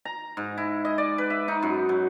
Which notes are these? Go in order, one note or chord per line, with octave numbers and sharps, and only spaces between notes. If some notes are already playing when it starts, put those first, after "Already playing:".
A#5
G#2
E4
D#5
D5
B4
E5
D#4
F#2
F#3